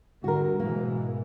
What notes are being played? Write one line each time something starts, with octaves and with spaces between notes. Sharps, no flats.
D3 G3 F#4 A#4
G#2 B2 E3 A#3